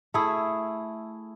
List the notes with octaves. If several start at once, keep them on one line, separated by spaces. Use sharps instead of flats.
A3 E4 G#4